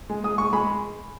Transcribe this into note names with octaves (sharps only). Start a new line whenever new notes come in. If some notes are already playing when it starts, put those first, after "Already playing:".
G#3
G#3 D#6
G#3 C#6
G#3 B5